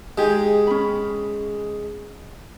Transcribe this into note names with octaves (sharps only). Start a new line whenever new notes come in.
G#3 D#4 G4 G#4
C#4 B5